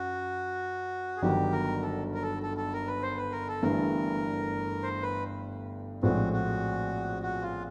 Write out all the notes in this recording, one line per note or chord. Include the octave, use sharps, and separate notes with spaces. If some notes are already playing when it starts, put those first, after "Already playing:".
Already playing: F#2 F#4
G#4
G1 G2 D#3 F#3 G4
A#4
A4
A#4
A4
A4
A4
A#4
B4
C5
B4
A#4
A4
G1 G2 E3 A3 A#4
C5
B4
A#1 A2 F3 G#3 C4 F#4
F#4
F#4
F4